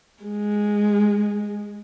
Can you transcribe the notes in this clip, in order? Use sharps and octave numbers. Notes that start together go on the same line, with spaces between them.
G#3